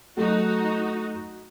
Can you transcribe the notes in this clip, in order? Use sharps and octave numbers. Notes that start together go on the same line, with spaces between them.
F#3 A3 D#4 F#4